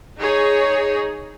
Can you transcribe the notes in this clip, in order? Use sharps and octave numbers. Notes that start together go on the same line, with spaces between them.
D#4 G#4 C#5